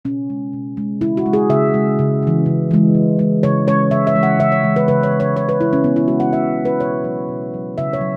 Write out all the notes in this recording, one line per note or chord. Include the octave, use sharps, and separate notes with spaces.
B2 C#4
G#3
B2
G#3
C#3 E4
F#4
G#3
G#4
C#3 E5
G#3
C#3
E3 G#3
C#3
E3 G#3
C#3
G#3
C#3 C#5
G#3 C#5
C#3 E5
E5
E3 G#3
F#5
C#3 E5
C#5
E3 G#3
B4
C#3 B4
C#5
G#3
C#5
C#3 C#5
B4
G#3 E4
C#4
C#3 B3
E4
G#3 F#4
F#5
C#3 E5
G#3
B4
B2 C#5
F#3
B2
F#3
C#3 E5
C#5
F#3